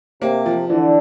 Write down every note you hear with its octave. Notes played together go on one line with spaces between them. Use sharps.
C3 A#3
F3
D3 E3